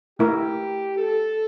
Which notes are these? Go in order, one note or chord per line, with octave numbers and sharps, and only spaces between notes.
A3 E4 G4 A#4
A4